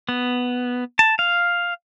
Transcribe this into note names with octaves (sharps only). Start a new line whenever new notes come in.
B3
A5
F5